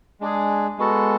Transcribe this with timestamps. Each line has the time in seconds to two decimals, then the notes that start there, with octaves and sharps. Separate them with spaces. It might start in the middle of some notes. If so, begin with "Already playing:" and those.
0.21 G#3 D4 G#4
0.78 G#3 B3 F#4 A4